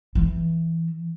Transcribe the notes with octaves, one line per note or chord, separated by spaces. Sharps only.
E3